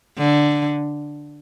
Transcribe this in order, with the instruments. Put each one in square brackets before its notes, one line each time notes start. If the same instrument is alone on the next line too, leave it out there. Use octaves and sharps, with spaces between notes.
[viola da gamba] D3